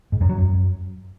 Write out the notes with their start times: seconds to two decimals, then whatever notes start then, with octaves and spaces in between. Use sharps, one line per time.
0.12 G#2
0.21 F#2
0.29 F#3
0.38 F#2